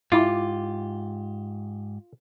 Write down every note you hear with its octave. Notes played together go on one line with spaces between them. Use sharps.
G#2 E4 F4 G4 D6